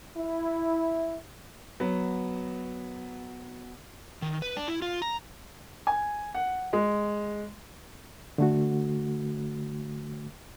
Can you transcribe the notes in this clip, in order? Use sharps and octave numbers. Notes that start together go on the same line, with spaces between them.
E4
F#3 B3
D#3
B4
D4
E4
F4
A#5
G#5
F#5
G#3
D3 A3 F#4